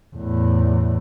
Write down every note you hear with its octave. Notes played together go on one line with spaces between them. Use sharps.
E2 A2